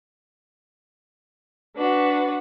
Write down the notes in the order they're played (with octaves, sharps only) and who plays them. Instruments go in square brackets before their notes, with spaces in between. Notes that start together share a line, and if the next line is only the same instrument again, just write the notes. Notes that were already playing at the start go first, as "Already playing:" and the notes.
[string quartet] D4 F#4 B4